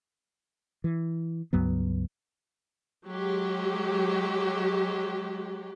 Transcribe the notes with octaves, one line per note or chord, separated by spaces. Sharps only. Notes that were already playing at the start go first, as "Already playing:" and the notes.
E3
C#2 G2 F#3 B3
F#3 G#3 G4